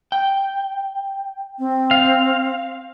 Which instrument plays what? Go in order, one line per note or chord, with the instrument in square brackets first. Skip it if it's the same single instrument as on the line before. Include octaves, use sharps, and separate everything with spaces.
[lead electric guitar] G5
[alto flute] C4
[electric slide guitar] F5